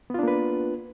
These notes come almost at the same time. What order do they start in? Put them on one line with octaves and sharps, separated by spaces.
B3 F4 D4 A#3 B4